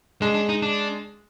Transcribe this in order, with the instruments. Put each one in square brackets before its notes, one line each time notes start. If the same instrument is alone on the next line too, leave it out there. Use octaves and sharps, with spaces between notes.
[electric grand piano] G#3 [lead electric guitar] D4
[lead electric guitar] D4
D#4
D4